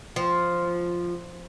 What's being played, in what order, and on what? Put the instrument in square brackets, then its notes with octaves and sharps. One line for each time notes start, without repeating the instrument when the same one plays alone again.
[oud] F3